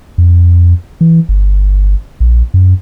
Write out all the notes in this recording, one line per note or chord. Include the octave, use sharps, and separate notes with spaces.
F2
E3
G1
A#1
F#2